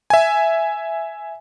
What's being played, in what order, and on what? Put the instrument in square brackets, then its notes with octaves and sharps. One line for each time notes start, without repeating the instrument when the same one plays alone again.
[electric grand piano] E5 G#5